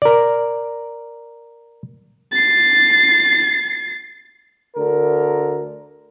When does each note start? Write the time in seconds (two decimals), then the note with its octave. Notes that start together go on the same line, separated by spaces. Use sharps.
0.02 A#4 D5
2.32 A6 C7
4.76 D2 D3 A#4